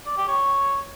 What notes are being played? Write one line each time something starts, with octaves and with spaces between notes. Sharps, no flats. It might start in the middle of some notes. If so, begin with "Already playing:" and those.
D5
G4
C#5